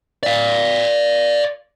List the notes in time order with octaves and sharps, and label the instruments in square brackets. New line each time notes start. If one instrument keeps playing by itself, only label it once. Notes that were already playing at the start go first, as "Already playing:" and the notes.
[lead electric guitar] D5 F5